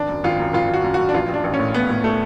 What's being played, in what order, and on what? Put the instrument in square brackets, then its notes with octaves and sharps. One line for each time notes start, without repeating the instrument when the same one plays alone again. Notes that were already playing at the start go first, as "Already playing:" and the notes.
Already playing: [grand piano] G#1 D4
F#2
G#1 F4
F#2
G#1 F4
G#1 F#4
F#2
F#2 F#4
D4
A1 F4
A1
D4
A1
C#4
A2
A2 B3
A2
A3